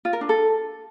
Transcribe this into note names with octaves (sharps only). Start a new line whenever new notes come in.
F4
A#4
D4
A4